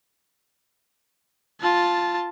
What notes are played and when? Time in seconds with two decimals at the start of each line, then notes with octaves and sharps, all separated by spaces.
1.61 F4 A5